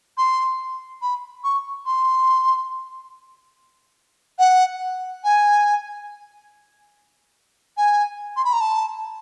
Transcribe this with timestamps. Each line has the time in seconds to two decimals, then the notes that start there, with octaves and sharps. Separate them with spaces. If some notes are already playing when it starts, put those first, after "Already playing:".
0.17 C6
1.02 B5
1.44 C#6
1.86 C6
4.39 F#5
5.24 G#5
7.77 G#5
8.36 C6
8.44 B5
8.53 A#5
8.60 A5